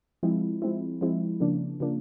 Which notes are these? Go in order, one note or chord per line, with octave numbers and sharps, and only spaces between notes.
F3 G#3 C4 E4
F3 G#3 C4 E4
F3 G#3 C4 E4
C#3 F3 A#3 D4
C#3 F3 A#3 D4